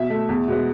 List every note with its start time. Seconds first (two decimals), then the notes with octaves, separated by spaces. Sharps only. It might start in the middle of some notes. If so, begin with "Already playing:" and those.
Already playing: B2 E5
0.10 A3
0.29 E2
0.48 B2 G#3 B3